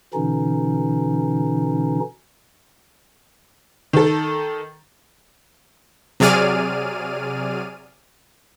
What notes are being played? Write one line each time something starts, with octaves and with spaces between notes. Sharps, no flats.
B2 D3 E3 C#4 D#4
D#3 A4
C3 F#3 G#4 D5 F6 D#7